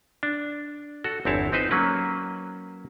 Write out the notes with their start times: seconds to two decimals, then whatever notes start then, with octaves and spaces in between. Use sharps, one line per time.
0.23 D4
1.04 F#4 A4
1.25 G1 E2 C4 E4 C#5 A5
1.52 C4 D#4 B4 C5
1.71 F#3 A#3 C#4 B4